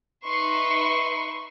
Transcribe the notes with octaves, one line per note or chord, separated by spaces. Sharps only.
D#4 B4 E5 C6 C#6